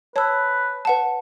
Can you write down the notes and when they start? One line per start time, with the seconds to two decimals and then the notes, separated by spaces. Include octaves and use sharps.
0.16 B4 C#5 A5 E6
0.85 B4 F#5 A5